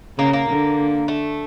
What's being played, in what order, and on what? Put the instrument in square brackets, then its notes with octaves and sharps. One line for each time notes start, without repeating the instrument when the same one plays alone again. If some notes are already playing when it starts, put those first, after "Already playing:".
[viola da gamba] C#3 [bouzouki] A#3
[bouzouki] A#3
[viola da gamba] D3
[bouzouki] A3